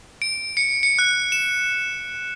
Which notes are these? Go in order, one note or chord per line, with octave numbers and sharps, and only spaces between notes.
D7
C#7
C#7
F#6
E7